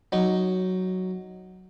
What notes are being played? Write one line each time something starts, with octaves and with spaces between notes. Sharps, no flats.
F#3 D#4